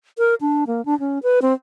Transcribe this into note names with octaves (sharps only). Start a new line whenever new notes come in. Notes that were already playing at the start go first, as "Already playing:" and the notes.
A#4
D4
A#3
D4
C#4
B4
C4